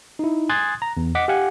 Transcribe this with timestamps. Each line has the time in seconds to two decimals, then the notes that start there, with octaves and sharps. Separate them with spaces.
0.19 D#4 E4
0.49 G#5 C6 D#6 F#6 G#6 A6
0.82 A#5
0.97 E2
1.15 D#5 F#5 D6 B6
1.28 G4 F5 F#5 G#5